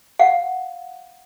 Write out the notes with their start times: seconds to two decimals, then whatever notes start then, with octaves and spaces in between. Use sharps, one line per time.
0.19 F5 F#5